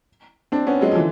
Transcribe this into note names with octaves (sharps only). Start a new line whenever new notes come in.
C4 D4
B3 C#4
F#3 G#3
F3
D3 E3